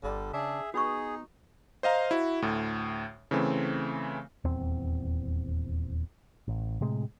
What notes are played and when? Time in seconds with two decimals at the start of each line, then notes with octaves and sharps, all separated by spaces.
0.04 G1 D3 G3
0.33 C#3 D4 G#4 E5
0.74 B3 D#4 F#4 G#4 C#6
1.83 C5 D#5 F5 A#5
2.11 E4 F#4
2.42 D2 A2
3.31 C#3 E3 A3 C4
4.44 D#1 E2 C4
6.48 A1
6.81 A2 C3 G#3